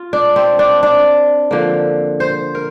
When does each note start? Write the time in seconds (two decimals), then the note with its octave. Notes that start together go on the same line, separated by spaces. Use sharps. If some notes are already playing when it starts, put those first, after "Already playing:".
Already playing: F4
0.13 D4
0.36 C4
0.59 D4
0.83 D4
1.51 D3 F3 A#3
2.20 C5
2.55 A#4